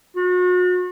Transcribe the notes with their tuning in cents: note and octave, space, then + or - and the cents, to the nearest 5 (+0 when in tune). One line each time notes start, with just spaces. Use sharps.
F#4 -40